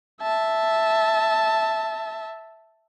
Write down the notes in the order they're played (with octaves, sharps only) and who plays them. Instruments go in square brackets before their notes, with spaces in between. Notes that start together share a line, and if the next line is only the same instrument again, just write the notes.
[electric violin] E5 A5